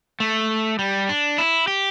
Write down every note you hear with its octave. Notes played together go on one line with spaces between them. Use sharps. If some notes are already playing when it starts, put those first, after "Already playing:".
A3
G3
D4
E4
G4